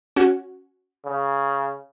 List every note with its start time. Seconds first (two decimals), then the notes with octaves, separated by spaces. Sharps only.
0.16 C#4 F#4
1.05 C#3